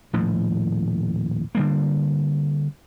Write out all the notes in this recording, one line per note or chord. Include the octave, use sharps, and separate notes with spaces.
D#1 A2 F3
D3 G3 A#3